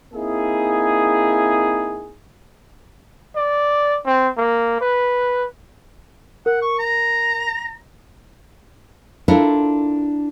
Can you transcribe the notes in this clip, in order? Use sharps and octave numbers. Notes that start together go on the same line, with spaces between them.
A#3 C4 D#4 E4 G#4
D5
C4
A#3
B4
A#4 F#5
C#6
A#5
D4 E4 F4 A4 A#4